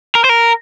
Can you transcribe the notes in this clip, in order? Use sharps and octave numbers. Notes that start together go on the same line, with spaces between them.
A#4
C5
A#4